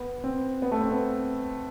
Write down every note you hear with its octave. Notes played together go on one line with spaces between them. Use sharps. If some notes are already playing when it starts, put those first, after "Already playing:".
Already playing: B3
C4
B3
A3
C4
B3